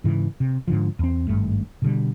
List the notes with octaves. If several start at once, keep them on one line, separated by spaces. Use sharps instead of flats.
G#2 C#3 E3
C3
G#2 D3 F3
E2 C4
G#1 G2 A3
B2 D3 G3